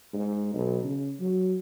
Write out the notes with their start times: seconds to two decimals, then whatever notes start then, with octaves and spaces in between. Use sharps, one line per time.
0.14 G#2
0.54 B1
0.84 C#3
1.20 F#3